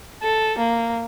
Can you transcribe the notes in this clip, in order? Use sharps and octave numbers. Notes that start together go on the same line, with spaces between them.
A4
A#3